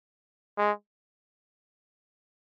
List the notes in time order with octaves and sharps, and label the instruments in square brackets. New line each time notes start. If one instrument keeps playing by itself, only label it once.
[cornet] G#3